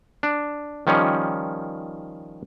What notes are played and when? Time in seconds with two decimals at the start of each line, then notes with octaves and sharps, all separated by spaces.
0.23 D4
0.87 D#3 F3 G3 C#4